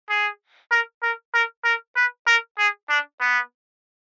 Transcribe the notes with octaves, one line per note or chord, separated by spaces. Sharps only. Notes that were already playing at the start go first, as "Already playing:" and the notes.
G#4
A#4
A#4
A#4
A#4
B4
A#4
G#4
D4
B3